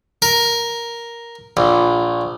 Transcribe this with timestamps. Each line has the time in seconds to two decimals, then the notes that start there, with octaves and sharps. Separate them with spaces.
0.22 A#4
1.57 A#1